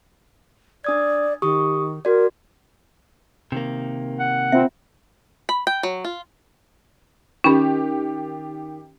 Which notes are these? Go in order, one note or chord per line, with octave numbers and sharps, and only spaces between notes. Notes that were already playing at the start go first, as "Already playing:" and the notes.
D4 D5 D#6 G#6
D#3 G4 C#6 D#6
F#4 A#4 D5
C3 D#3 A#3
F#5
C4 F4 E5
B5
G5
F#3
F4
D#3 C#4 G4 B5